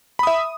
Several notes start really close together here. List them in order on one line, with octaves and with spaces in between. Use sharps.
B5 D#6 E5